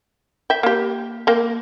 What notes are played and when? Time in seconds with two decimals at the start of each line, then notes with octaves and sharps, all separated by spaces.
0.50 E5 G5
0.63 A#3 G4
1.27 A#3 G5